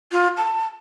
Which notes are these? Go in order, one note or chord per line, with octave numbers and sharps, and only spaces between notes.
F4
A5